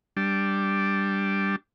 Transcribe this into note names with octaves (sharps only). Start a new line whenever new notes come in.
G3 D4